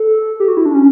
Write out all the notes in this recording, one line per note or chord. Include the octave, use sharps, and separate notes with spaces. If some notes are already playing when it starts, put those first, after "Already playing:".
Already playing: A4
G4
F#4
E4
D4
C#4